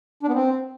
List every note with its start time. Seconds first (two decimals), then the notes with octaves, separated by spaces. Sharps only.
0.23 D4
0.28 B3
0.33 C4